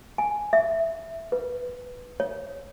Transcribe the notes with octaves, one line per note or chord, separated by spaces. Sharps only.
G#5
E5
B4
C#5